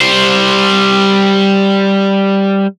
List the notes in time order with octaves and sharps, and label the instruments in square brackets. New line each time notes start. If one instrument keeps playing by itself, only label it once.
[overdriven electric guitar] G3 C5